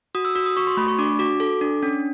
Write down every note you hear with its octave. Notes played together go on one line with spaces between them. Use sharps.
F#4 D#6
E6
F#4 E6
D#6
F#4 C#6
C6
A3 B5
C#6
D4 D6
F#4 D6
A4
D4
C#4